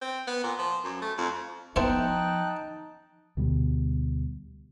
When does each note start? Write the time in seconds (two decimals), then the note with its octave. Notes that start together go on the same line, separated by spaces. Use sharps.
0.02 C4
0.27 B3
0.44 A#2
0.59 F3
0.84 F#2
1.02 A3
1.18 F2
1.76 F3 B3 D#4 E4 C5 G5 A5 F#6
3.37 D2 B2 G3